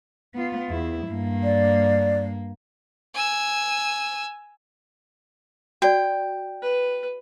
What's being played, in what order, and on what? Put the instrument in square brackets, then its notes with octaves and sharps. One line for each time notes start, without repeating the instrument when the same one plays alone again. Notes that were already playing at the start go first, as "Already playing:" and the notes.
[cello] B3 F4
E2 E4
G2 A#3
[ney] D5
[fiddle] G#5 E6
[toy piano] F#4 D5 [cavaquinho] G5
[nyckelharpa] B4